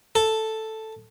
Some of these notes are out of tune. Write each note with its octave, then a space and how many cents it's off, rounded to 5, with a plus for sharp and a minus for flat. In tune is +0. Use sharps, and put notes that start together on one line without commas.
A4 +0